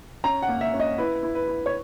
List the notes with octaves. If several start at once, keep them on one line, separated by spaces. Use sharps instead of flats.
C#4 A#5
F#5
A#3
E5
C#4
D#5
E4 B4
E4
B4
E4
C#5